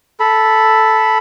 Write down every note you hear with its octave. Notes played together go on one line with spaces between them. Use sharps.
A4 B5